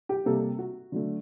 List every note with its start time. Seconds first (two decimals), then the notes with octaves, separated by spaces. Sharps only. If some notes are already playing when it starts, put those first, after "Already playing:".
0.09 G4
0.25 C3 G3 A#3 A4
0.58 F#4
0.92 D3 F#3 A3